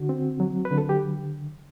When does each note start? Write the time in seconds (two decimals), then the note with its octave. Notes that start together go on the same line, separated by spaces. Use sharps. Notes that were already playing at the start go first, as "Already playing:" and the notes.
Already playing: D3 F#4
0.09 C4
0.40 F#3
0.65 B4
0.71 D3
0.78 A4
0.89 G4